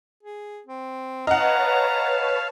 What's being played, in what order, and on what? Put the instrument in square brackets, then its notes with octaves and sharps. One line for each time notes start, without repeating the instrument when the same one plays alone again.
[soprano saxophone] G#4
C4
[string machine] B4 C#5 A5 [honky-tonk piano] D#5 F#5 [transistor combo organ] F5 [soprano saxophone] A#5